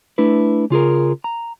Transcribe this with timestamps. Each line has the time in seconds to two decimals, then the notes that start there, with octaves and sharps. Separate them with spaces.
0.18 A3 D4 E4 B4
0.70 C#3 F4 G#4 A#4
1.24 A#5